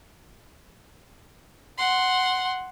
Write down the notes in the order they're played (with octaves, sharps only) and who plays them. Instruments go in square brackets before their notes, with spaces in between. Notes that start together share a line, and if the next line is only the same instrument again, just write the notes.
[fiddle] F#5 C6